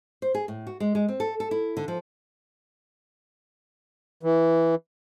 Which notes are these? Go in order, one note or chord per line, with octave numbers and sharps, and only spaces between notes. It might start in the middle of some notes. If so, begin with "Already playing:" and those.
C5
G#4
A2
F#4
G#3
G#3
C4
A4
A4
E4
D3
F3
E3